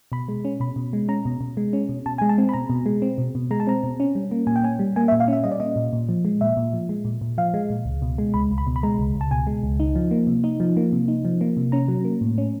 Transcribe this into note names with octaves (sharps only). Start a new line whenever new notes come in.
B2 B5
G#3
C#4
B2 B5
B2
G#3
C#4 A#5
B2
B2
G#3
C#4
B2
B2 A5
G#3 G#5
A5
C4
B5
B2 A#5
B2
G#3
C4
B2
B2
G#3 A#5
A5
C4 A#5
B2
C#4
G3
A#3
A#2 G#5
G5
C#4 G#5
G3
A#3 G#5
E5
A#2
F5
C#4 E5
G3 D#5
D5
A#3 D#5
A#2
A#2
F3
G#3
A#2 E5
A#2
F3
G#3
A#2
A#2
F3 F5
G#3
A#2
C#2
B2
G#3
C#2 B5
C#2
B5
B2
B5
G#3 A#5
C#2
C#2
A5
B2 G#5
G#3
C#2
D#4
F3
A#3
C3
D#4
F3
A#3
C3
D#4
F3
A#3
C3
C#4 A#5
F#3
A#3
A2
C#4